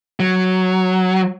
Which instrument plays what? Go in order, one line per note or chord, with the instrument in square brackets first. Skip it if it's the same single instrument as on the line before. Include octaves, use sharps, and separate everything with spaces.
[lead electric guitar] F#3